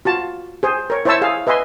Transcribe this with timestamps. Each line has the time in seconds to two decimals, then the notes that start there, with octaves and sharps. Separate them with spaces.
0.05 F4 F#4 A5
0.63 G#4 C5
0.90 A#4 C#5
1.05 E4 C5 C#5 E5 A5 E6
1.22 G#4 F5
1.47 B4 D#5 E5 G#5 C6